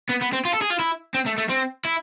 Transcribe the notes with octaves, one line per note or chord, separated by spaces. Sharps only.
B3
B3
C4
F4
A4
G#4
F4
E4
C4
A3
A3
C4
E4